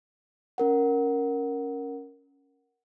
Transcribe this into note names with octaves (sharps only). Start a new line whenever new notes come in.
C#4 A#4 F#5